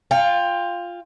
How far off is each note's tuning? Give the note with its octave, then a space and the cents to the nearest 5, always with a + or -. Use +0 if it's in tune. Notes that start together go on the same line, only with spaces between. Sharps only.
F4 +0 G5 +25